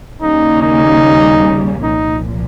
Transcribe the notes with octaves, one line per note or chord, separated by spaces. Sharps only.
D#2 C#3 G3 A#3 C#4 D#4
D#4
C2 A#2 F3 D#4